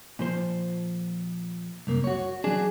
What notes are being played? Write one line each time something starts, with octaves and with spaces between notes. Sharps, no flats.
A#2 F3 C5
C2 F#2 A#3
F#4 C#5
F#3 D4 G#4